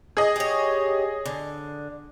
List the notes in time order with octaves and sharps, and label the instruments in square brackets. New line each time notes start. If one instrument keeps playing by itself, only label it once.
[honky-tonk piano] G#4 D#5
[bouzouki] G4 C#5
D3